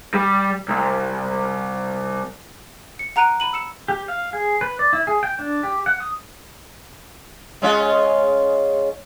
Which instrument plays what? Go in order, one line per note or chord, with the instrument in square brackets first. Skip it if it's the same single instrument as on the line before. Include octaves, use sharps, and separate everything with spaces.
[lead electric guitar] G3
C2
[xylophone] C#7
F#5 A#5 F#6 D7 D#7
B5 D#7 F#7
E6 C#7 E7
[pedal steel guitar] G4
F5
G#4
B4
D5
E4
G#4
G5
D4
G4
F#5
D#6
[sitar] G#3 C#4 F4